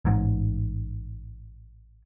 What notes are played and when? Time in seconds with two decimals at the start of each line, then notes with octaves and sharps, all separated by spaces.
0.05 A1 G#2